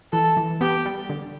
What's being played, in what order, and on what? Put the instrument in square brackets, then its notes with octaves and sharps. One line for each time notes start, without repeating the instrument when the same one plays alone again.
[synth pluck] E3 [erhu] A4
[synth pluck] E3
[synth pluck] B3 [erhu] G4
[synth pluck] G3
D3